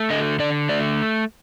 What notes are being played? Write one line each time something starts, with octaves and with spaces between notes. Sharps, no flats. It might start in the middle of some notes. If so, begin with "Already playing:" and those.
Already playing: A3
D3 D#5
D3 D5
A3 D5